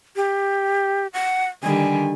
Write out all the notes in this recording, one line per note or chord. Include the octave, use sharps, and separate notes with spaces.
G4
F#5
D3 D#3 G3 G#5